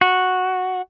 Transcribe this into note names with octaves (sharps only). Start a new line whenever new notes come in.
F#4